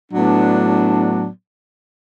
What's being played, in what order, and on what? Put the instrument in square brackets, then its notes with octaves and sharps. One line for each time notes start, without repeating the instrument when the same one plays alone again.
[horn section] A2 F#3 B3 D4